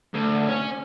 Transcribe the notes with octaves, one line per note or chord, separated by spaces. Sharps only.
D2
C#4